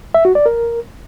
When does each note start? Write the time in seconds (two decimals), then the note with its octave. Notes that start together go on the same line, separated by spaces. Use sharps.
0.14 E5
0.25 F#4
0.35 D5
0.46 A#4